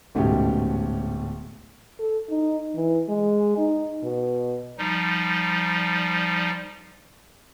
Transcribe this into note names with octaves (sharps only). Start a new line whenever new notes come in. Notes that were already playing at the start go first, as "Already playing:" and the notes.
D1 G#2 B2 A3 C#4 G4
A4
D#4
E3
G#3
D#4
B2
F3 G3 D#4